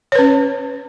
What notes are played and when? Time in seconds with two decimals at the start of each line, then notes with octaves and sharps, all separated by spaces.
0.12 C#5
0.15 B4
0.19 C#4